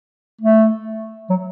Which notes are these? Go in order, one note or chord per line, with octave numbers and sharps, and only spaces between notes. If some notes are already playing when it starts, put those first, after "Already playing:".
A3
F#3